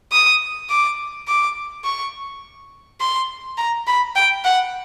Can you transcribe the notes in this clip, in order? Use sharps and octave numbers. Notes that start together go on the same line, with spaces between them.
D#6
D6
D6
C#6
C6
A#5
B5
G5
F#5